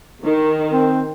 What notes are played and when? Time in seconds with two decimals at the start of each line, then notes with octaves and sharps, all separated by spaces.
0.24 D#3
0.73 C4